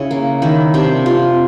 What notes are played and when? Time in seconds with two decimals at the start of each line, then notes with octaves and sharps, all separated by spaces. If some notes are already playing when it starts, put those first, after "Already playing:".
Already playing: C#3 E4
0.11 A#3
0.42 D#3 E4
0.74 C3 D4
1.06 C3 F4